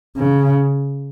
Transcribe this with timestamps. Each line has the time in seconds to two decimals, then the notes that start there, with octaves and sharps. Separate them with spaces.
0.16 C#3